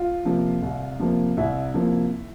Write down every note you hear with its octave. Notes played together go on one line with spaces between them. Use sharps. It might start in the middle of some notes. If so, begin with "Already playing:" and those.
Already playing: F4
C3 F3 A#3
C2
C3 F3 A#3
C2 E4
C3 F3 A#3